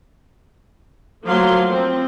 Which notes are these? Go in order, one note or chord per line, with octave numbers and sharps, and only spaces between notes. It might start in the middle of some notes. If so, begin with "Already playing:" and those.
F3 F#3 A3 A#3 F5 C6
F3 C4